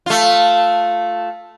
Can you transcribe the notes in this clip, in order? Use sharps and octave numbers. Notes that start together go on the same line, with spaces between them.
A3 F4